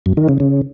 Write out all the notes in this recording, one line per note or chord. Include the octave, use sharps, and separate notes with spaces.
F#2
D#3
C#3
C#3